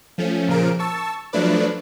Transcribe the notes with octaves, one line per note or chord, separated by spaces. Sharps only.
F3 A3 C#4
A#2 C#3 F3 A#4 D7
A5 C#6 E6
F3 F#3 A3 D4 B4 D5